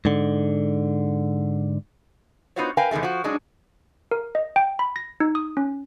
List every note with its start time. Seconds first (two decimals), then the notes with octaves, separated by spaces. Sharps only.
0.05 G#2 D3
2.56 B3 D#4 F4 F#4 C5 C#5
2.77 A#4 B4 F5 G5 G#5
2.91 E2 C3 D#3 G#3 A3
3.03 F3 F#4
3.24 F#3 G#3 D4 D#4
4.11 A#4
4.35 D#5
4.56 G5
4.79 B5
4.96 A#6
5.20 D#4
5.35 D#6
5.57 C#4